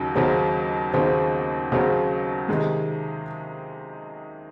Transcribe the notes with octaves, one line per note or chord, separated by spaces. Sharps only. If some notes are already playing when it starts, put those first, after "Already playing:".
Already playing: D#2 C#3 F#3
D#2 C#3 F#3 C4
D#2 C#3 F#3 C4
D#2 C#3 F#3 C4
C3 D#3 G#3